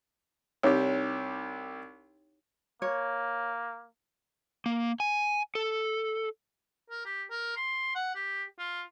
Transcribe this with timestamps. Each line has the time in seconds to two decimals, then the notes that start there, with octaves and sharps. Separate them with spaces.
0.63 C2 D#4 G4 C#5
2.82 A#3 C#5
4.66 A#3
5.00 G#5
5.55 A4
6.90 A#4
7.06 G4
7.30 A#4
7.56 C6
7.95 F#5
8.15 G4
8.59 F4